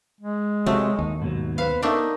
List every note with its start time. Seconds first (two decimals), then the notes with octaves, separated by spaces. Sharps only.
0.21 G#3
0.66 C3 F#3 A3
0.99 D#2 D#4
1.22 G#2 B2 F#3
1.58 B3 B4 C5 F5
1.82 A3 A#3 D4 D#4